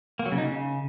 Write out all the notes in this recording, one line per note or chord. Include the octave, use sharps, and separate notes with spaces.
A#3
F#3
C#3
D#4
C#3